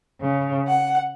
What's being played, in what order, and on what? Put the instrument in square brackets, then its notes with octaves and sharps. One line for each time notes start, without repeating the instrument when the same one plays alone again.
[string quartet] C#3
F#5